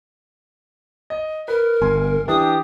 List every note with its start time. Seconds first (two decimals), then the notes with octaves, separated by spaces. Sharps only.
1.10 D#5
1.48 A#4 B4
1.82 G1 G#5 C6
2.28 E3 D4 G4 D#6